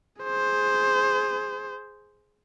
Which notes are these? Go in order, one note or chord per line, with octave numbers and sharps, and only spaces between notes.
G#4 C5